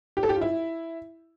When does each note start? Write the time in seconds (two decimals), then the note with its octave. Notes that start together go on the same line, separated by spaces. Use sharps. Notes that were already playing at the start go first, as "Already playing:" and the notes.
0.17 G4
0.23 A4
0.29 G4
0.35 F4
0.41 E4